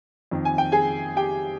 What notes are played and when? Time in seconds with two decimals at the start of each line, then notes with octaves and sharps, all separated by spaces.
0.31 F2 D#3
0.45 G#5
0.58 G5
0.72 G#4 G#5
1.16 G4 G5